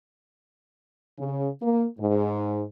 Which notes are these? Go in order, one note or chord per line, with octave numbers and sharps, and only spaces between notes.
C#3
A#3
G#2